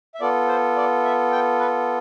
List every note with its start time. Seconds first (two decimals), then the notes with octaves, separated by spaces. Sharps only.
0.15 E5
0.21 B3 F4 A4 D5
0.48 C5
0.77 D5
1.04 E5
1.32 G5
1.59 B4